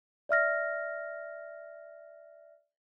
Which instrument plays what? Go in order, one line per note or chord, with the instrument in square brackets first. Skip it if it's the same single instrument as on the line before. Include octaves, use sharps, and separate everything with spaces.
[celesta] D5 E5 F6 A#6